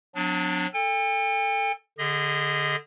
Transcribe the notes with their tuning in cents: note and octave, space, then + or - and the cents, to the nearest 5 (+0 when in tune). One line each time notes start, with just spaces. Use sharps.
F#3 -35 B3 +45 D4 +0
A4 +10 G5 +45
D3 +0 G#4 -30 D#5 +5